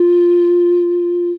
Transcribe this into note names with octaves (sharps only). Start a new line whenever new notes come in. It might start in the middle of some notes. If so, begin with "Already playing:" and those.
Already playing: F4